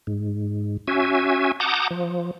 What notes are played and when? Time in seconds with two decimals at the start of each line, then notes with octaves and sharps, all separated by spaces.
0.07 G#2
0.88 C#4 F#4 E5 G#5
1.60 F#5 A5 A#5 D6 D#6 G6
1.91 F3